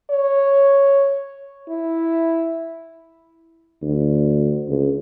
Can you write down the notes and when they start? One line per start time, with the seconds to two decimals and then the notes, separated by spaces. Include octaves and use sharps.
0.10 C#5
1.69 E4
3.82 D2
4.69 C#2